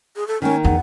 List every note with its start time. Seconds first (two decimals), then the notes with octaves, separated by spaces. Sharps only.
0.16 G#4
0.28 A4
0.42 D#3 A#3 C#4
0.64 E2 F#5